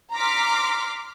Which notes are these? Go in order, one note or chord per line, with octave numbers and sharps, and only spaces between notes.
A#5 C6 D6 F6 B6